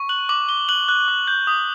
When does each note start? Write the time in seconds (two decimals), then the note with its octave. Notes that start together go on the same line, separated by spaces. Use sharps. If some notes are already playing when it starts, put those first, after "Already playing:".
Already playing: C#6
0.09 F#6 F#7
0.29 D6 F#7
0.49 D6 G7
0.69 F#6 F#7
0.89 F#6
1.08 D6
1.28 G6
1.47 D#6